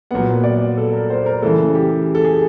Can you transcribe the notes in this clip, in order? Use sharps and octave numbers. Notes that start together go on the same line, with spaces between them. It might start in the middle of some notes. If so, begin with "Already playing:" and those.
A#2 F#3 B3 F#5
D5
A4
A#4
C5
A#4
C#3 E3 A3 A4
G4
A4
G#4